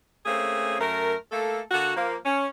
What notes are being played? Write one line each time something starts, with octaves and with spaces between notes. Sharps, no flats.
A3 A#3 C4 C#4 G#4
F#2 A3 A#4
A3 A#3 A4
D3 A#3 F#4
F3 A#3
C#4